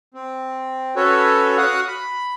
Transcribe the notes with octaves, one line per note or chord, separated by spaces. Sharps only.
C4
C#4 F#4 A4 B4 C#5
F#4 F5 F#5 D#6 F#6
B5